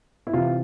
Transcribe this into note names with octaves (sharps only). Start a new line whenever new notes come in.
E4
C3 E3 F4